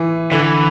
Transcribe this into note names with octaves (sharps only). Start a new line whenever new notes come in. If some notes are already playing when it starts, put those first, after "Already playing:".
Already playing: E3
D3 E3